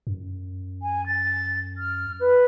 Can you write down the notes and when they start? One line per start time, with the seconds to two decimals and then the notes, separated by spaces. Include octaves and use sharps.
0.07 F#2
0.82 G#5
1.06 A6
1.77 F6
2.19 B4